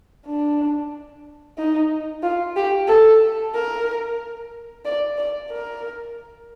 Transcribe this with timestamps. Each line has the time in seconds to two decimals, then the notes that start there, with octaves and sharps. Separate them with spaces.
0.26 D4
1.58 D#4
2.23 F4
2.56 G4
2.88 A4
3.54 A#4
4.85 D5
5.18 D5
5.51 A#4